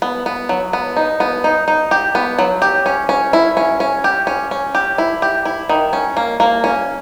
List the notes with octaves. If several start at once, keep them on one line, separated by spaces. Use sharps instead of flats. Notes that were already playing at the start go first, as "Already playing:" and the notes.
B3
B3
F#3
B3
D#4
B3
D#4
D#4
G4
B3
F#3
G4
C#4
C#4
E4
C#4
C#4
G4
C#4
C#4
G4
E4
G4
E4
D#3
C#4
A#3
A#3
C#4